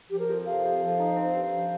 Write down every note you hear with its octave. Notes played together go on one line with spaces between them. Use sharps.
F3 G4
A#4
F2
C3 F5
F2
F3
D#4
C4
G2
F3